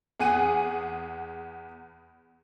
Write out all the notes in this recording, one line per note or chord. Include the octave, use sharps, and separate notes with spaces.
E2 G#4 F#5 D#7